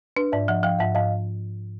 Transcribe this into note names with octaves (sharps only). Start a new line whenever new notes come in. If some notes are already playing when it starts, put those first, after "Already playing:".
D4 B4
G#2 D5 E5
F3 E5 F#5
F3 F5 G5
G#2 E5 F#5
G#2 D#5 F5